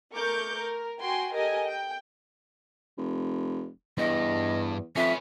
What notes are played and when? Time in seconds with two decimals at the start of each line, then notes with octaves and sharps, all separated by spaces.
0.14 A3 A#4 C#6 D6 G6
0.57 A#4
1.01 F#4 G5 G#5 C6
1.35 G4 A4 A#4 D#5 G#5
1.66 G5
2.97 F1
3.98 E2 G2 D#5
4.96 F2 C#4 B4 E5